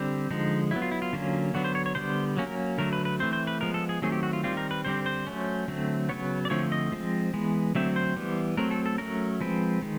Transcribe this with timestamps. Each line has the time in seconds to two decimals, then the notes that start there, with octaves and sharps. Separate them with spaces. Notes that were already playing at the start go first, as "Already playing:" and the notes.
Already playing: D3 G3 C4
0.31 D3 F3 G#3 D#4
0.71 F#3 B3 E4
0.82 F4
0.91 E4
1.02 F4
1.13 D3 F#3 A#3 C#4
1.54 D3 F#3 B3 F#4
1.64 C5
1.75 C#5
1.86 C#5
1.95 D3 G3 B3 C5
2.37 F#3 A#3 C#4
2.47 A#4
2.78 D3 F#3 A3 A#4
2.93 B4
3.05 B4
3.20 E3 A3 C4 C5
3.33 C5
3.47 B4
3.60 F3 G#3 B3 A#4
3.74 A4
3.89 G#4
4.02 D#3 F#3 A3 C4 G#4
4.12 G4
4.23 F#4
4.33 F4
4.44 D#3 G3 C4 F4
4.57 A#4
4.71 B4
4.85 D3 G3 C4 C5
5.06 C5
5.27 F#3 A3 C#4
5.68 D3 F#3 A3 C4
6.09 C#3 F#3 B3 C#5
6.45 D5
6.50 D3 F3 A3 C4 C#5
6.72 D#5
6.92 F3 G#3 C4
7.33 E3 G#3 B3
7.75 D3 F#3 A3 C4 E5
7.96 C5
8.17 E3 G3 B3
8.57 F#3 A3 C4 A#4
8.71 A4
8.86 A4
8.98 F#3 A3 C#4 A#4
9.41 F3 G#3 C4 B4
9.82 D#3 G#3